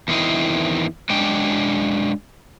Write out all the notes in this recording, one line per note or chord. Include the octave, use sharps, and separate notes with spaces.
E2 D#3 C4 E4 D#5
F#3 G#3 C#4 D4 G5